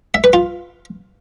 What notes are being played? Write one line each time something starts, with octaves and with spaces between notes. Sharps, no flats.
E5
B4
F4